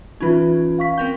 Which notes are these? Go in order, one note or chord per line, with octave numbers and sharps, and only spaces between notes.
E3 C#4 D#4 F4 B4
F5 C#6 B6
C4 A#4 G5 G6